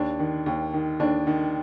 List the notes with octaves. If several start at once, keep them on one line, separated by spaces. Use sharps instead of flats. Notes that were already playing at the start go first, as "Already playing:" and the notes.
Already playing: D#2 D4
D#3
D#2
D#3
D#2 D4
D#3